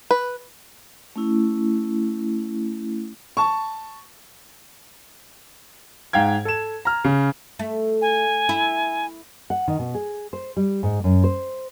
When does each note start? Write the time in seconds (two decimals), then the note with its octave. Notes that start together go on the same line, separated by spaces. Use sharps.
0.11 B4
1.16 A3 C#4 E4
3.37 A5 C#6
6.13 G#2 F5 G5 G#6
6.45 A4 E7
6.85 A#5 F6
7.05 C#3
7.59 A3
8.01 G#5
8.49 E4
9.50 F#5
9.68 D#3
9.79 B2
9.95 G#4
10.33 C5
10.57 G3
10.83 G#2
11.04 F#2
11.24 C5